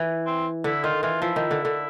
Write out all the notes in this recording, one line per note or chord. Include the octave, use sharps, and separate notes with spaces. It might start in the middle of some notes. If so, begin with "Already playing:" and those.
Already playing: E3
C4
D3 E4
D#3 F4
E3 F4
F3 E4
D#3
D3
D3